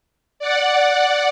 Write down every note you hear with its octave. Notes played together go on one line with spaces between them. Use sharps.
D5 F#5